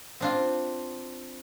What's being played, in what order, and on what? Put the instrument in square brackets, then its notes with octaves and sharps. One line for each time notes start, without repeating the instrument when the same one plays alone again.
[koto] C4 D4 F4